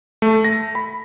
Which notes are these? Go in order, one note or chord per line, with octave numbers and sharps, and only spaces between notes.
A3
A#6
B5